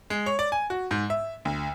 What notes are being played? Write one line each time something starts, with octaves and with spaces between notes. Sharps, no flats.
G#3
C#5
D5
G#5
F#4
G#2
E5
D2